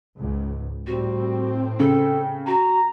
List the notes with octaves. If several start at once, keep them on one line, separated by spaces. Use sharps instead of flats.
C#2 G#2
A2 G3 C4 F#4
C#3 A4 G5
F#4 A#5